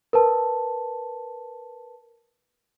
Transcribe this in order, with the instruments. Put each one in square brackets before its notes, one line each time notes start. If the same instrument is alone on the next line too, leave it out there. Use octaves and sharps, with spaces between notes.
[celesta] A#4 B4 A5